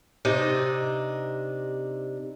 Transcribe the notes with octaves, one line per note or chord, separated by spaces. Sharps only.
C3 D4 D#4 D#5